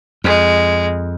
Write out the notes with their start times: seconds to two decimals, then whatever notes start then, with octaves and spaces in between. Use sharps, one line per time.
0.24 F2 G#3